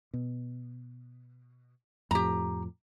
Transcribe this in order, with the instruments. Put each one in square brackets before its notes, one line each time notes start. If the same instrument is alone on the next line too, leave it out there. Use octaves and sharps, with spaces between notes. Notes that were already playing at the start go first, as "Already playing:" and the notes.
[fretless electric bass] B2
[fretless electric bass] F2 A2 [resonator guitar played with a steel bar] G4 A#5